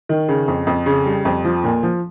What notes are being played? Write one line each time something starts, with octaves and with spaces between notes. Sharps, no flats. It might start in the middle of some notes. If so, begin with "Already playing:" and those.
D#3
C#3
F2
F2
C#3
G3
F2
F3
A#2
F3